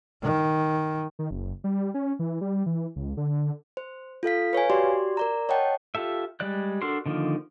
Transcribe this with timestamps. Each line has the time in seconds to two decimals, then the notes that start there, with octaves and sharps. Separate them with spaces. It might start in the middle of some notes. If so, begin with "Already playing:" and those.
0.23 D#3
1.19 D#3
1.31 F#1
1.64 G3
1.94 C#4
2.19 E3
2.41 G3
2.66 E3
2.96 C#2
3.17 D3
3.77 C5
4.23 F4 A4 F5 B6
4.53 B4 C#5 F5 G#5
4.70 F#4 G4 D5 C6
5.17 A#4 D5 A#5
5.49 C#5 D#5 F#5 G5 A5
5.95 F4 G4 A4 E5
6.40 G3 G#3 D5 F#6
6.82 D4 F#4 A4 A#4 C6
7.06 D3 D#3 F3 A#3